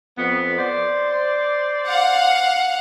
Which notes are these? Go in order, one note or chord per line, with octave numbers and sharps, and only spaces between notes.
F2 B3
C5 D5
F5 F#5